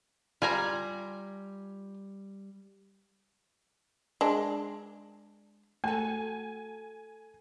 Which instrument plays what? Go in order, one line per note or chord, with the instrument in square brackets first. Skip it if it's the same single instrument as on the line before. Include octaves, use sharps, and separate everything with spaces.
[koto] G3 [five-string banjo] F4 G#5 A#5
[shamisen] G#3 D4
[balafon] A3 [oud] F#4 A4 [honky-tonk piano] G#5